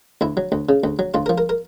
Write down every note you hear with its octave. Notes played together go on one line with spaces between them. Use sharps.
D2 E4
F#3
D2
C#3
D2
F#3
D2 F4
A#4
F3
A#4
A#4